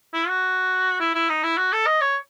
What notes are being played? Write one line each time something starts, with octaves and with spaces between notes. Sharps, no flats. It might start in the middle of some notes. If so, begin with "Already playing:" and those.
E4
F#4
E4
E4
D#4
E4
F#4
A4
D#5
C#5